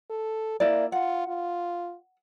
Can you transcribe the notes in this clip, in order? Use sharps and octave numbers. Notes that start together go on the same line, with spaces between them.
A4
A#3 E4 D5
F4 F#5
F4